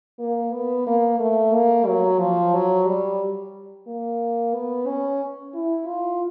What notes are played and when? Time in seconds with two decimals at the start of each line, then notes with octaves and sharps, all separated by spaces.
0.19 A#3
0.53 B3
0.87 A#3
1.20 A3
1.54 A#3
1.86 F#3
2.20 F3
2.54 F#3
2.87 G3
3.88 A#3
4.54 B3
4.87 C#4
5.54 E4
5.87 F4